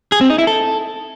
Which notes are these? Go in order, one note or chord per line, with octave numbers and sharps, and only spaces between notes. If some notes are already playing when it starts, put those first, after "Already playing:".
G#4
C4
D#4
E4
A4